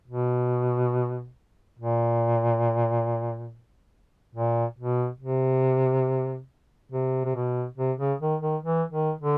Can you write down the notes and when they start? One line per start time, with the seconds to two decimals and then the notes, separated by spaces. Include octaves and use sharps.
0.08 B2
1.79 A#2
4.35 A#2
4.79 B2
5.21 C3
6.92 C3
7.25 C3
7.36 B2
7.78 C3
7.99 C#3
8.21 D#3
8.42 D#3
8.63 E3
8.92 D#3
9.21 D3